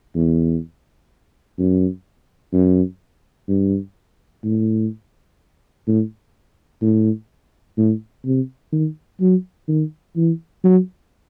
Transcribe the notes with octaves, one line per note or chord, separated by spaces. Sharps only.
E2
F#2
F#2
G2
A2
A2
A2
A2
C3
D#3
F#3
D#3
E3
F#3